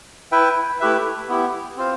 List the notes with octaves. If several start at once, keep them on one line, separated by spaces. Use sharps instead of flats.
E4 B4 E5 G5
A3 E4 G4 B4 E5
B3 E4 G4
C4 F4 C5 F5